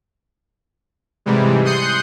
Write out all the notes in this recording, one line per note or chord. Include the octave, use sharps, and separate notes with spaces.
G#2 C3 E3 G3 G#3
C6 D#6 F#6 G6 C7 C#7